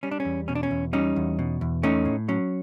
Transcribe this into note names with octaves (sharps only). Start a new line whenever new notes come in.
G3 C#4
D4
C#4
E2
B2 C#4
D4
C#4
E2
G3 C#4 D#4
E2
B2
E2
A3 C#4 D#4
A2
F#3 C#4